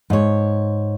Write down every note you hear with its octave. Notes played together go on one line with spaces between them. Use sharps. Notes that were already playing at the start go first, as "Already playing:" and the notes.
G#2 C#5